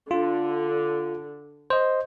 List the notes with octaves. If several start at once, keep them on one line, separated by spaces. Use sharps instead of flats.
D3 F4
C5 D#5